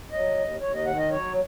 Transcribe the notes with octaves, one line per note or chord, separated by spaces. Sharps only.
F#3 D#5
D#2
D#2 C#5
D#5
D#3 F#5
D#5
F#3 C#5